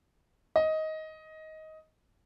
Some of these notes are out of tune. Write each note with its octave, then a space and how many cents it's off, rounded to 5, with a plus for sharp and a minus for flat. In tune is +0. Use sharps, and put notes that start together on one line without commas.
D#5 +15